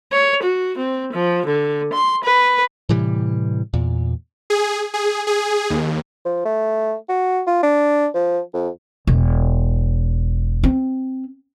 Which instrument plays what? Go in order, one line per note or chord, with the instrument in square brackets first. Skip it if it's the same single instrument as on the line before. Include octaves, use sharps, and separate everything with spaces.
[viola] C#5
F#4
C4
F3
D3
C6
B4
[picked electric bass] A2 C3 E3 G3
E2 A#2
[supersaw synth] G#4
G#4
G#4
D#2
[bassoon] F3
A3
F#4
F4
D4
F3
F2
[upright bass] E1
C4